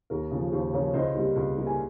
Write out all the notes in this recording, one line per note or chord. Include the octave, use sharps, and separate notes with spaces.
D#2 A#4
C#3 F3
D#2 C5
C#3 F3 A#4 C#5
C#2 C5 D#5
C3 G3 A#3
C#2
C3 G3 A#3
G#5